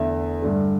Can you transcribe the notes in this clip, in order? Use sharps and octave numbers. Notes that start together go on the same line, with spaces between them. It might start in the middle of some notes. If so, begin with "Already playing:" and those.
Already playing: E2 D3 A3 E5
G2 D3 A3